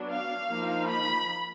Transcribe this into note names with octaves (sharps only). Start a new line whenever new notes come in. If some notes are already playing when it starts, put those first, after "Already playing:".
Already playing: F#3 B3 D4
F5
F3 A#3 D#4
B5